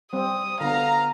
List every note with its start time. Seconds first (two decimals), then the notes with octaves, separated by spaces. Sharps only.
0.13 G3 C4 D#6
0.61 D3 B3 F5 A#5